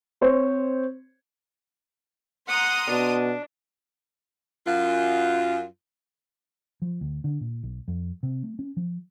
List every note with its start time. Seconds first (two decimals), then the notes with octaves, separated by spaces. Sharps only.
0.21 C4 C5 C#5
2.48 F#5 A#5 C6 D#6
2.90 B2 D4
4.66 F#2 F4
6.82 F3
7.01 D2
7.24 D3
7.41 A#2
7.63 B1
7.88 F2
8.23 C3
8.43 A3
8.59 C#4
8.77 F3